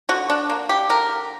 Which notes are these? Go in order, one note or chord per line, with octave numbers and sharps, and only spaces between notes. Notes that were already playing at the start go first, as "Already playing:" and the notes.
D3 F#4
D4
A#3
G4
D3 A#4